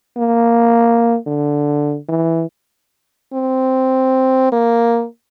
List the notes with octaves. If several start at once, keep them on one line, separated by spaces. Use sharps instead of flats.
A#3
D3
E3
C4
A#3